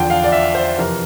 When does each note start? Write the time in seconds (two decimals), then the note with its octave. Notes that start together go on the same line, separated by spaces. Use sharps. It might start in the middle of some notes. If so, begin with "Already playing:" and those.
Already playing: E2 D3 F3 G5
0.10 F5
0.24 D5
0.32 E5
0.55 C5
0.78 F2 C3 E3 A#4